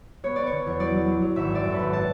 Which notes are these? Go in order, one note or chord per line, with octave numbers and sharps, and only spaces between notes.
B3 C#5
B3 D5
C#5
D3
E2
F#3 D5
F#3
F#3
F#3
G#1 E5
F#2 D5
F#2
A4 B4
G#1
A5